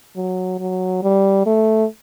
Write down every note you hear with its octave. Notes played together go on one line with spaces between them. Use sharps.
F#3
F#3
G3
A3